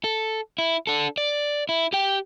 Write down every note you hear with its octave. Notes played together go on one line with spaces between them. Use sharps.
A4
E4
D4 A4
D5
E4
G4 G5